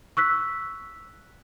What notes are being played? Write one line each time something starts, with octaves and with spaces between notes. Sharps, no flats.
C#6 E6 F#6 B6